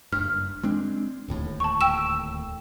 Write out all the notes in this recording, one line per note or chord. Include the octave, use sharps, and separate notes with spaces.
F#1 G2 F6
G#3 C4 D4
D1 D#2 A2
A5 C#6
G5 E6 E7